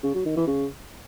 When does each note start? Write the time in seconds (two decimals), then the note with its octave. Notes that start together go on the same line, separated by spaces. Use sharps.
0.03 C#3
0.14 F#3
0.25 D#3
0.36 E3
0.47 C#3